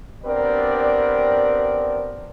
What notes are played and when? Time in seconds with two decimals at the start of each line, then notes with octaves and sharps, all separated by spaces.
0.24 B3 C4 D4 G4 A#4 D5